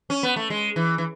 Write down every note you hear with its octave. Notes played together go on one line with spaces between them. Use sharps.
C#4
B3
A3
G#3
E3
E3